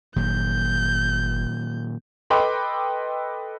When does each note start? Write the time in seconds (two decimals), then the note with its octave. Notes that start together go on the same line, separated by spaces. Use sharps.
0.16 G1 A#2 D#3 F#3 G6
2.30 A4 B4 D#5 G5 C6 D6